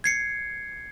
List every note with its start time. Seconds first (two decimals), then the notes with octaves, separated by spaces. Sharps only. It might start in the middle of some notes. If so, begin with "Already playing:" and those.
0.04 G#6 C7 C#7